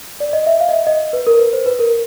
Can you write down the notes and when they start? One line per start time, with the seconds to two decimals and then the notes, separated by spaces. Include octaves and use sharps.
0.20 D5
0.33 D#5
0.47 E5
0.61 F5
0.69 D#5
0.73 E5
0.87 D#5
1.13 B4
1.27 A#4
1.39 B4
1.53 C5
1.66 B4
1.79 A#4